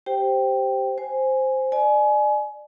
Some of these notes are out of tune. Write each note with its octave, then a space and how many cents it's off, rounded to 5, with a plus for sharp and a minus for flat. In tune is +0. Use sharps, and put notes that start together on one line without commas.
G4 -5 C5 +0 G5 +0
C5 +0 G#5 +0
D5 +30 G#5 +25